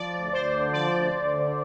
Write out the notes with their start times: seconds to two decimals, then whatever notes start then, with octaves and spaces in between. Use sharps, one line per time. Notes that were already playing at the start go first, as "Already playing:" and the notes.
Already playing: F3 D5
0.14 D2
0.33 D2 C5
0.53 D3
0.73 F3 D5
0.93 D2
1.13 D2
1.33 D3